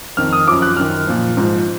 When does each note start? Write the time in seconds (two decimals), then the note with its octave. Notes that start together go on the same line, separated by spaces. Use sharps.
0.17 F2 D#3 F6
0.33 D#6
0.47 F#2 F3 D6
0.62 F#6
0.77 F#2 D#3 F6
1.07 A#2 F3
1.37 G#2 F3